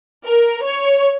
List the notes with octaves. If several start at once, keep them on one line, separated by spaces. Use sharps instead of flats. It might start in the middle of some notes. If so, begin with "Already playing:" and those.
A#4
C#5